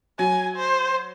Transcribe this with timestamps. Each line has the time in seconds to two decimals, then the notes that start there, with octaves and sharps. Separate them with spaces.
0.19 F#3 G#5
0.57 C5